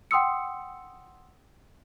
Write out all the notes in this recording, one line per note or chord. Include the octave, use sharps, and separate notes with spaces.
F#5 G5 C6 D#6 E6 C#7